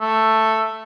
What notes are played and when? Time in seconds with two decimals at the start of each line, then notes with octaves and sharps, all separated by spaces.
0.01 A3